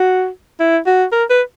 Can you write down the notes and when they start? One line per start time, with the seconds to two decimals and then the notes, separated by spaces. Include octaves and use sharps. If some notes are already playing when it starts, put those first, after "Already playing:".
Already playing: F#4
0.60 E4
0.86 F#4
1.12 A#4
1.30 B4